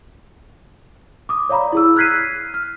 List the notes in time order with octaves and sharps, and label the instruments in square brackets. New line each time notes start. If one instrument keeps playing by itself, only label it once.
[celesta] D6 D#6
C#5 D5 F5 A#5 B5
E4 G#4 E6
F6 F#6 G#6 B6 C7 D#7
F6